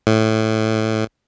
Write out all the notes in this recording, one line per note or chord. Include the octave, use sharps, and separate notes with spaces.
A2